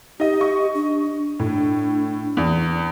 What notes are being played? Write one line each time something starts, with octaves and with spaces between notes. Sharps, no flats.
D#4 G4 D#5
D#5 C#6
D4
A2 D4
E2